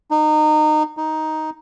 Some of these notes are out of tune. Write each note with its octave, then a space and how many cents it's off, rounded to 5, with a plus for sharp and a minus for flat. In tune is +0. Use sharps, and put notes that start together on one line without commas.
D#4 -25
D#4 +5